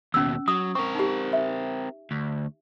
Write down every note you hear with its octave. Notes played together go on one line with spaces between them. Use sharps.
D#2 B2 C#4 E6
F#3 D#6
C4 A#4 C#6
D#4 G4
E5
D2